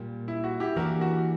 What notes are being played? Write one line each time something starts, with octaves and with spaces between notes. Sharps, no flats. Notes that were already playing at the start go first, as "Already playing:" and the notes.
Already playing: A#2 G3 A#3
E4
F#4
E4 G4
E3 A#3 D4 F#4 G4 A#4
F#4